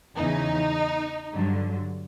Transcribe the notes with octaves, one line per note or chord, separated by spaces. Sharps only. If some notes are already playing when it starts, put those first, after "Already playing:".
E2 C#3 E3 D#4
G2 D3 F#3